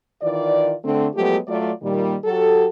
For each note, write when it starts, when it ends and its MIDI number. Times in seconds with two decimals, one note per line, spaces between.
0.22 0.74 51
0.22 0.74 52
0.22 0.74 65
0.22 0.74 74
0.84 1.07 50
0.84 1.07 57
0.84 1.07 60
1.15 1.37 53
1.15 1.37 54
1.15 1.37 56
1.15 1.37 57
1.15 1.37 59
1.15 1.37 67
1.47 1.71 54
1.47 1.71 57
1.47 1.71 65
1.47 1.71 74
1.82 2.15 46
1.82 2.15 51
1.82 2.15 55
2.25 2.66 54
2.25 2.66 66
2.25 2.66 67
2.25 2.66 69